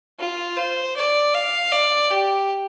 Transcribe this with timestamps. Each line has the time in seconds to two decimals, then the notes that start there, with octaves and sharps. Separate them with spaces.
0.19 F4
0.57 C5
0.96 D5
1.34 F5
1.72 D5
2.11 G4